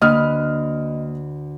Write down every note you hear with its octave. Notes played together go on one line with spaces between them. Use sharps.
D2 A#3 B4 D#5 D#6 F6 F#6